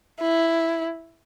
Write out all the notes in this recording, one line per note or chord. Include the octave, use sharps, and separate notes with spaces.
E4